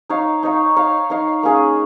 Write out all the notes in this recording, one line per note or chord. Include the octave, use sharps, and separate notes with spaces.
D#4 C#5 F5
D#4 C#5 F5
D#4 C#5 F5
D#4 C#5 F5
A#3 C#4 G#4 F5